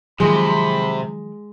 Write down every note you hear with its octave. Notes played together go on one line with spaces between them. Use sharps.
C3 D#3 F3 F#3 G#3 B5